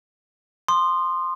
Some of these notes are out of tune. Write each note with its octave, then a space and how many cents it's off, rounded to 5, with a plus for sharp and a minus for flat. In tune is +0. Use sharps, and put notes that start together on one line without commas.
C6 +0 D#6 -30